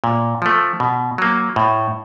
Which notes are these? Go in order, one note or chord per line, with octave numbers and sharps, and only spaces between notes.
A#2
F3 A3
B2
F#3 A#3
A2